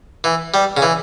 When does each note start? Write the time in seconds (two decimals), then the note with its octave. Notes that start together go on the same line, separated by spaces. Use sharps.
0.24 E3
0.54 G3
0.77 C#3
0.82 E3